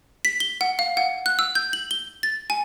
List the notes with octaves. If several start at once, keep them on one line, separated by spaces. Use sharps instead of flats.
B6
G7
F#5
F5
F#5
F#6
E6
G6
F#7
G7
A6
G#5